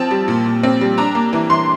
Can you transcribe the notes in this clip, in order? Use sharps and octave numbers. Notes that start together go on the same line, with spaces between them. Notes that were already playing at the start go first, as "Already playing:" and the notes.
Already playing: F3 C4 A5
G3
A#2
A#2
C4
G3
D4 A#5
A#3
E3
E3 C6